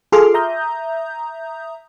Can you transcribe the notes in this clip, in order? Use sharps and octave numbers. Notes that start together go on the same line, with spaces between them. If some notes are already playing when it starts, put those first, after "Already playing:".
F4 G#4 A4 C6 D6 F6
E5 A#5 D#6 G6